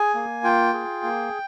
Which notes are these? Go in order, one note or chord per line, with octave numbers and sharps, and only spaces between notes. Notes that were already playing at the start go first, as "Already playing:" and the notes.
Already playing: G#4 G#5
A#3
F4 G5
G#4
A#3